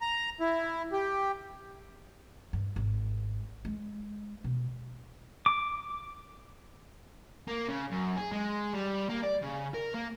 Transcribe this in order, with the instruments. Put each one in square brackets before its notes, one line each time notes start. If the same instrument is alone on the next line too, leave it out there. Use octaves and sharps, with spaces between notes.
[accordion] A#5
E4
G4
[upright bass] G2
G#1
G#3
B2
[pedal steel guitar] D6
[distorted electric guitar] A#3
C#3
F#2
G#4
G#3
G3
A#3
D5
C#3
A#4
A#3